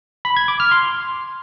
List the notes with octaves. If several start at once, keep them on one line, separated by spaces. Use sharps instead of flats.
B5
G#6
D6
F6
C6